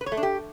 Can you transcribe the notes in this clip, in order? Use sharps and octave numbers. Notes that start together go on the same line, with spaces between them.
B4
C#5
A3
D4
G4